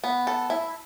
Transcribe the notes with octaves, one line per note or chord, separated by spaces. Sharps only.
B3
A4
E4